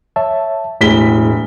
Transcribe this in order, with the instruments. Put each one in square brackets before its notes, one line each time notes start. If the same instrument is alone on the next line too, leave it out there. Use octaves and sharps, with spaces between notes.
[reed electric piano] C#5 E5 A5
[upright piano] E1 B6 G7 [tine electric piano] A2 [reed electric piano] G4 G#4